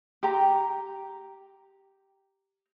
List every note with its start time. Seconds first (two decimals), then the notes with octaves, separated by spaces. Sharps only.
0.23 G4 G5 A#5